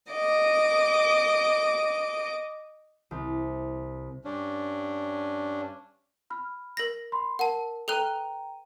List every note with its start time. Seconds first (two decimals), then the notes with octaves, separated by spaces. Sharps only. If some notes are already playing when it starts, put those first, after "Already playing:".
0.11 D#5 D6
3.11 C2
4.25 G2 C#4 D4
6.30 B5 F6
6.77 A#4 A#6
7.12 B5 C6
7.39 A#4 F#5 A5
7.88 A4 B4 G5 A#5 F#6 D#7